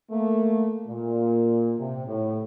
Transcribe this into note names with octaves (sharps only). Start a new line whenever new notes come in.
A3 A#3
A#2
C3
A2